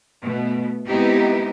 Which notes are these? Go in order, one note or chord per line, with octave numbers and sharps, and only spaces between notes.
B2 A3
G#3 B3 C4 D#4 E4 G4